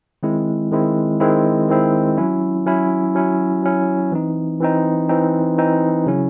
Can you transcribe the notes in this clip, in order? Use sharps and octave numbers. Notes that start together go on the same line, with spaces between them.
D#3 G#3 C4 E4
D#3 G#3 C4 E4
D#3 G#3 C4 E4
D#3 G#3 C4 E4
F#3 C#4 E4
F#3 C#4 E4
F#3 C#4 E4
F#3 C#4 E4
E3 C4 D#4
E3 C4 D#4
E3 C4 D#4
E3 C4 D#4
C#3 F#3 C#4 E4